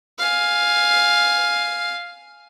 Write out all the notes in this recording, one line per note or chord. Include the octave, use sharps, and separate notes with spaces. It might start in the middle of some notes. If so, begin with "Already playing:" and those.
F5 G#5